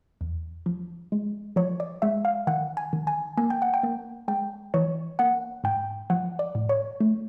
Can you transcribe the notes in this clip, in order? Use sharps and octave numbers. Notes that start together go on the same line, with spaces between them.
E2
F3
G#3
F3 C#5
D5
G#3 E5
F5
D#3 F#5
G#5
D#3
G#5
A#3 G#5
G5
F#5
G5
A#3
G#3 G5
E3 C#5
A#3 F#5
G#2 G5
F3 F#5
D5
A2
C#5
A3